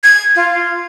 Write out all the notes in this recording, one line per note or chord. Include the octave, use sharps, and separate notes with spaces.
G#6
F4